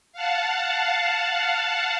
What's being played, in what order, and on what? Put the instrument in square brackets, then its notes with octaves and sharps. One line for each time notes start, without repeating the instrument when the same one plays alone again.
[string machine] F5 F#5 A5